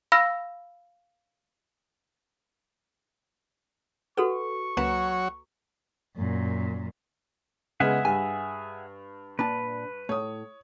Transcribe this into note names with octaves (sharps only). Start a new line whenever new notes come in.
F5 B5 E6 F6 A#6
F#4 A4 B4 F#5 C#6
C#2 F#3 A#3 F#4 B4 C#5 A#5
F#2 A#2
C#3 G#3 B3 G#4 E5 F#5
G2 G#5
A#2 D4 B4 A5
A2 C#5 D#6